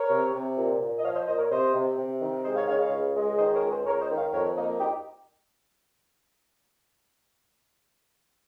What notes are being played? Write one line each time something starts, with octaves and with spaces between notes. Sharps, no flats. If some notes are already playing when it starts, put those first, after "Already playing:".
Already playing: A#4 C#5
C3
C3
A#2
A#2
D#5
F3 C#5 F5
C5 D#5
A#2 C5 D#5
A#4 C#5
C3 C5 D#5
C3
C3
D#3
G#3 C5 D#5
C#5 F5
C#3 C#5 F5
C#5 F5
C#2
G#3
D#3 C5 D#5
A#4 C#5
C#2
G#4 C5
C#2 A#4 C#5
C5 D#5
D#3
C#5 F5
F2 A#4 C#5
A#3 D#4
D#4 G4